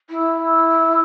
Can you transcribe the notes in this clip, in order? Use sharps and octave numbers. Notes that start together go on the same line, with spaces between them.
E4